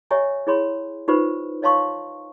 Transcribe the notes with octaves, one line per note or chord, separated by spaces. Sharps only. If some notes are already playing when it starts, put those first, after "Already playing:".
G4 C#5 D#5 E5 G#5 A#5
E4 G#4 C#5 B5 C6
D#4 F4 G4 B4 C5 B5
C#5 D#5 F5 A5 C6 C#6